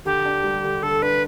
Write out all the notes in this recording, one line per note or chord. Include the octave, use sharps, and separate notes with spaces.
D3 G4
D4
G3
D3
D3 A4
D4 B4